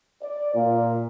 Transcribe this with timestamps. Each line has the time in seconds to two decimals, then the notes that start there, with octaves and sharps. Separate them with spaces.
0.22 D5
0.54 A#2